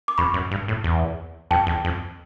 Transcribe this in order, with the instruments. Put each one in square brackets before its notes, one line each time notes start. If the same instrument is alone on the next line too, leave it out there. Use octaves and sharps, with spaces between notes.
[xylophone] D6
[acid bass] F2 [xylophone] B5 C#6
[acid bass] F#2
G2
A2
E2
[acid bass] F2 [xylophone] G5 A5
[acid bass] E2
F2